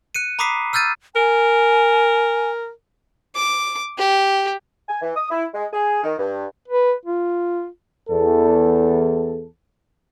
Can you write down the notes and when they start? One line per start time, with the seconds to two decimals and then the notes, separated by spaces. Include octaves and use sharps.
0.15 F#6 C#7 D#7
0.39 A#5 B5 D6 D#6 B6 C7
0.73 E6 F6 G6 A6 D#7
1.16 A#4 G#5
3.35 D6
3.98 G4
4.89 G#5
5.02 E3
5.16 D#6
5.30 E4
5.54 G#3
5.73 G#4
6.03 D#3
6.18 G2
6.68 B4
7.05 F4
8.09 E2 A4